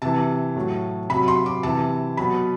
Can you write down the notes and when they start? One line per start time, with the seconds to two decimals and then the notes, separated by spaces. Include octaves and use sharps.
0.02 C3 E3 A5
0.56 A2 F#3
1.09 C3 F#3 B5
1.28 C6
1.46 D6
1.63 C3 E3 A5
2.17 B2 F#3 B5